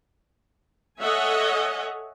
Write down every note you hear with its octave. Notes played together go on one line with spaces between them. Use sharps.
A4 C#5 D#5 E5 F#5 G#5